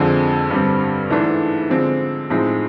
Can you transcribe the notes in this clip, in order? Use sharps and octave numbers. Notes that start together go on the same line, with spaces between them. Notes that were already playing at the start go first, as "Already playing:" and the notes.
Already playing: F2 D3 F3 G#3 C4
G2 D3 G3 C4
G#2 E3 A3 D4
D3 F3 G#3 C4
A2 F3 G#3 C4 D#4